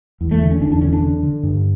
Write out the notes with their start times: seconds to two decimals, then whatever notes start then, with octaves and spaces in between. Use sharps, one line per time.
0.21 E2
0.31 A3
0.41 D3
0.51 C#4
0.61 E2 D4
0.72 D4
0.81 D3 C#4
0.93 D4
1.02 D3
1.23 D3
1.43 G2